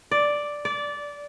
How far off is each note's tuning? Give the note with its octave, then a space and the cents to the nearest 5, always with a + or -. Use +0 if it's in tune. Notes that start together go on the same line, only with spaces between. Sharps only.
D5 +0
D5 -15